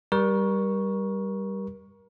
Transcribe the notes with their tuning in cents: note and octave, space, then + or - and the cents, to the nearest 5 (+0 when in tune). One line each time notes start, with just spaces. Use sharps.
G3 +0 A#4 +30 C#6 +0